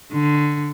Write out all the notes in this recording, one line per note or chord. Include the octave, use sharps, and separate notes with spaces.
D3